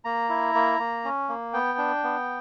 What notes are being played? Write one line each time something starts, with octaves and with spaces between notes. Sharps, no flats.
A#3 A#5
E4
A#3
A#3
C#4
A#3
B3 G5
D4
B3